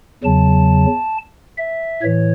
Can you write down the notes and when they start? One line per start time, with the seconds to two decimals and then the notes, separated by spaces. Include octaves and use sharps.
0.24 E2 C#3 F#3 A5
1.57 E5
2.02 A2 E3 C#5